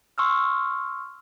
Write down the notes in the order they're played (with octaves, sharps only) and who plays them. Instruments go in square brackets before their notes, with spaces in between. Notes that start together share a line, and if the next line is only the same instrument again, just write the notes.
[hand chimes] C6 C#6 E6 F6